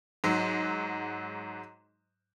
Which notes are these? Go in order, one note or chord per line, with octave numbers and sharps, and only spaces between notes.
G#2 F#3